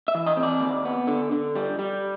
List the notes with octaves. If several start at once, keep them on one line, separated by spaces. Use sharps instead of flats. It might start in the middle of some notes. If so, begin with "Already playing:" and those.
E5
E3
D#5
C4
D5
D#2
B3
D3
D3
G3
G3